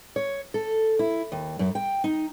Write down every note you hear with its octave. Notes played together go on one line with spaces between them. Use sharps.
C#5
A4
E4
D#2
F#2
G5
D#4